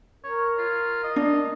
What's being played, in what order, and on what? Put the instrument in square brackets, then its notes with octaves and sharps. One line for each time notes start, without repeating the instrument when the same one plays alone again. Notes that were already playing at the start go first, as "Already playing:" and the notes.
[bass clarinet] A#4 [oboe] C#5
[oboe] F4
D#5
[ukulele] D4